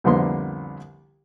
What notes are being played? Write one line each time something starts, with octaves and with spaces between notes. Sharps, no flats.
C2 F2 D3 A#3 B3 C6